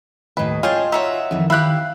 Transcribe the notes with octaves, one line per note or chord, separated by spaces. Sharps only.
D#2 A2 B4 D#5
C#4 F4 G#4 G5 A5
D#4 F#4 C#5 E5
F2 D#3 E3
E4 G4 F5 B5 F#6